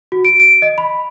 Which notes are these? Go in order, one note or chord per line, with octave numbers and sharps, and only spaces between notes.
F#4
D7
D7
D#5
B5